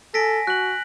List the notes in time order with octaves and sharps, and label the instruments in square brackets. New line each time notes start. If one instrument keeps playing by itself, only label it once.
[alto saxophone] A4 [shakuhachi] G#5 [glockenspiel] A#6 B6 D7
[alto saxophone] F#4 [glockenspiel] F#6 F#7